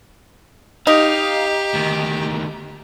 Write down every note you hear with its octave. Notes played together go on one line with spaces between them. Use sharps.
D#4 G4 F5
D2 D#3